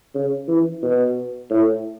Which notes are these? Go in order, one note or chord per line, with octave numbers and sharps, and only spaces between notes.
C#3
E3
B2
A2